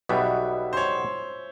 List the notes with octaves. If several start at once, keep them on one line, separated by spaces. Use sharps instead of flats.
B1 B2 G3 B3 E5
C5
C#5